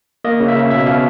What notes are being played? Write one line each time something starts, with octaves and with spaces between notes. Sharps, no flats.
A#3 D#5
C#3
E5
C#3
B2 E5
B2 F5